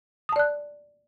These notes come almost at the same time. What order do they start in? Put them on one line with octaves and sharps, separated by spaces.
D#6 A5 D5 F#6